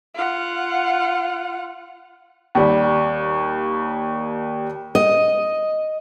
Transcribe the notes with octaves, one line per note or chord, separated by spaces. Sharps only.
F4 F#5
D#2 G3
D#5